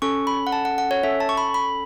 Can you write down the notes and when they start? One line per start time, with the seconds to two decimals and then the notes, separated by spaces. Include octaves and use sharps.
0.02 C#4 A4 C#6
0.27 B5
0.47 F#5
0.52 A5
0.65 F#5
0.78 F#5
0.91 C#5
1.03 C#4 A4 E5
1.20 A5
1.29 C#6
1.37 B5
1.54 B5